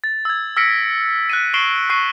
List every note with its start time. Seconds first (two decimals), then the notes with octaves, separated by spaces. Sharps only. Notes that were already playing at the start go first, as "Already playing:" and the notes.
0.04 A6
0.25 E6 G#6
0.57 E6 F6 A#6 B6 C#7 D7
1.30 F#6 B6 D#7
1.54 C#6 C7 D7 E7 F#7 G7
1.90 C#6 F#6 C7 D#7